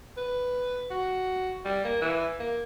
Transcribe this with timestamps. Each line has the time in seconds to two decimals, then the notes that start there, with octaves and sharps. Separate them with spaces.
0.17 B4
0.90 F#4
1.65 G3
1.84 A#3
2.01 E3
2.39 A#3